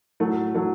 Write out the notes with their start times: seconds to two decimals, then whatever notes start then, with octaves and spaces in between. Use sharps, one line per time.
0.20 A2 F#3 A3
0.55 A2 F#3 A3